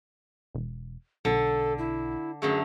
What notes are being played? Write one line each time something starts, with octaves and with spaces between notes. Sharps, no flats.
E1
B1 D3 A4
E4
F#2 D3 A3 G#4